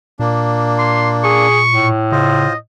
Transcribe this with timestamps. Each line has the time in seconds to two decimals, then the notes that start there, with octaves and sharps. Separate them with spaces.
0.19 A#2 A#3 D4
0.79 C6
1.24 G#4 C#6
1.73 A2
2.12 C#3 F4 C5 D#5